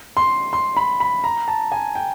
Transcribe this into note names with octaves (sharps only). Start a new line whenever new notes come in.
C6
C6
B5
B5
A#5
A5
G#5
G5